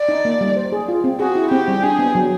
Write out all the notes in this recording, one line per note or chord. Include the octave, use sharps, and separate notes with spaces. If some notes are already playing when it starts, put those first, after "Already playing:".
Already playing: D5
D#4
A#3
G3
C5
G#4
F4
C4
F#4 G#4
E4
C4 G4
G3
D4 G#4
B3
F#3